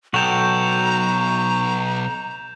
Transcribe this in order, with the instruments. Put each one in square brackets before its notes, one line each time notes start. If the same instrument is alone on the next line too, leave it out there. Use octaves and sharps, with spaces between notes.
[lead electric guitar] B1 [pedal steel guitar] F#4 A4 G5 [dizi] A#5 [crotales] G6 E7 F7